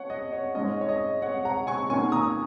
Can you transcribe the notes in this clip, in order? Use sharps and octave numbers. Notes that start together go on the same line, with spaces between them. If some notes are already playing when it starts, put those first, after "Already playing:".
Already playing: C#5 F#5
D#5
C#5
G#2 G#3 C#4 D#5
C#5
D#5
C#5 F#5
F#5 A#5
G#5 C#6
D#2 D#3 A#3 C#4 G#5 C#6
A#5 D#6